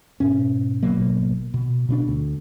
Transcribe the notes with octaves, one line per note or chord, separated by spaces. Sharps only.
G#2 B2 C#4
G#1 B2 F#3 A#3
B2
B2 A3 D4
D2